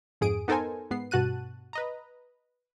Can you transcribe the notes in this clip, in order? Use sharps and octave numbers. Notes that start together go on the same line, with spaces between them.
F2 G#2 G#4 D#6 D7
B3 D#4 A4 A#4 C5 G#5
G#2 B3 C7
G2 B2 F#4 A5 F#6 D#7
B4 D#5 A#5